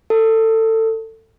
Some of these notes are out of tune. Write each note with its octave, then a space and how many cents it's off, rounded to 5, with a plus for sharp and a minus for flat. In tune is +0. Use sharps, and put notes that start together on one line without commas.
A4 +25